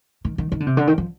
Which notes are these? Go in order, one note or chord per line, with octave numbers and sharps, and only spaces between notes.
D#3
D#3
D#3
D3
C3
D3
D#3
F3